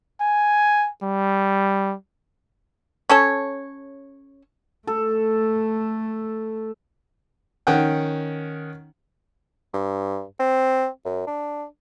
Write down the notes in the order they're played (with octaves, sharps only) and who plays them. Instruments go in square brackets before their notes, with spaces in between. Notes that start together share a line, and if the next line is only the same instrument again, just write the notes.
[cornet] G#5
G3
[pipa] C#4 A4 C#5
[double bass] A3 [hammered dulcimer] A4
[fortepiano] D#3 C#4 F#5 G5
[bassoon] G2
C4
F#2
D4